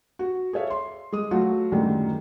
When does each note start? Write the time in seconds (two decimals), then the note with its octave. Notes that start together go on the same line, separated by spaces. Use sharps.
0.19 F#4
0.53 G#4 A4 C#5 E5 F5
0.70 C6
1.12 G#3 D#6
1.31 F#3 A3 F4 F#4
1.72 F#2 A2 D3 D#3 G3 G#3